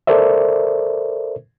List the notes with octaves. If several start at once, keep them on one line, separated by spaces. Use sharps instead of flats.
A4 A#4 C5 D5 E5